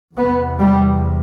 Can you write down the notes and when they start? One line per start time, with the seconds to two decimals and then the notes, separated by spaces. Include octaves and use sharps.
0.17 E2 C3 B3
0.59 G3